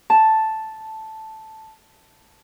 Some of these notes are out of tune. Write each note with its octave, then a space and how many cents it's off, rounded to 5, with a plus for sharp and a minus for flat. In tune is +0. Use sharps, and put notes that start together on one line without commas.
A5 +0